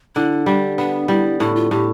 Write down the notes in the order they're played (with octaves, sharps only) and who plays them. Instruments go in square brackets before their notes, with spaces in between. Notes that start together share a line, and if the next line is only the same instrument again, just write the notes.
[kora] D3 [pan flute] E4
[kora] G3 [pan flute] D4
[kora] B3 [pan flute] D4
[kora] G3 [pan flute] E4
[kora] A2 [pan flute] E4
[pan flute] F4
[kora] A2 [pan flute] G4